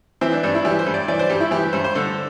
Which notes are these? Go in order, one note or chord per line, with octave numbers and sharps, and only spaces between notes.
E3 C4
D4
G2 D4
E4
E3 G4
C5
G2
D5
E3 D5
C5
G2 G4
E4
E3 G4
G2 C5
C5
D3 A4